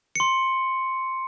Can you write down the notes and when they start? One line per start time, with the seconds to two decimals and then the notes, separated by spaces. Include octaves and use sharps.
0.16 C6 C#7